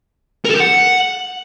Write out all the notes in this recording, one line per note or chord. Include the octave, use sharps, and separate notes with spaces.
A#4
A4
G4
F#5